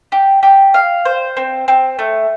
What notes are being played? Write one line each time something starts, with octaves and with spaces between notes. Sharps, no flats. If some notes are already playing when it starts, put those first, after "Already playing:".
G4
G4
F5
C5
C4
C4
A3